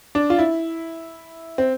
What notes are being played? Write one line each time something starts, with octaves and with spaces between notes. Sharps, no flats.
D4
F4
E4
C4